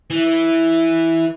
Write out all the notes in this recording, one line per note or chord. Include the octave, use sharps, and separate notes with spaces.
E3